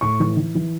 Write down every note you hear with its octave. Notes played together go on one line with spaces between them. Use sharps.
A2 C#6
E3
E3
E3